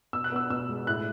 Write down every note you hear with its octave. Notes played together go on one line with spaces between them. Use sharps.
B2 E6
F#6
B3 E6
B2 E6
G#3
A2 F#6